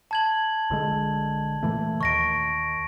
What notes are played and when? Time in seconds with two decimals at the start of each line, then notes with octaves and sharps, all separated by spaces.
0.11 A5 G#6 F#7
0.70 A#1 D3 G#3
1.63 A#2 E3 A3
2.01 D#2 D#3 C#6 A#6 D7